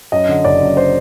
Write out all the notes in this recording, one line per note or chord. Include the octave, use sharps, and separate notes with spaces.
F#2 D#5
D3
F#1 D5
F#2
C5